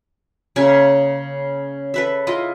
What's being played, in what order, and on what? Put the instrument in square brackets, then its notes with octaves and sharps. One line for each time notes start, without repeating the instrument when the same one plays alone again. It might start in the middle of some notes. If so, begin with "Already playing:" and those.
[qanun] C#3 A#3 E5 G#5
A4 B4 E5
E4 F4 D#5